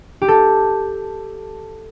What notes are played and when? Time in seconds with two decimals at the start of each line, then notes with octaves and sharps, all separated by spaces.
0.22 G4
0.28 A4